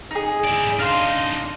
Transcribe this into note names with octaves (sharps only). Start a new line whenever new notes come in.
D#4 G#4
E4 D5
D4 D#4 F5 C6